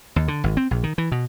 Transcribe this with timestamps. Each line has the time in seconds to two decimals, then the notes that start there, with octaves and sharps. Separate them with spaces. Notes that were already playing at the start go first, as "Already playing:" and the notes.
0.16 D#2
0.28 D3
0.44 G#1
0.57 C4
0.71 A#1
0.83 D#3
0.98 E3
1.12 B2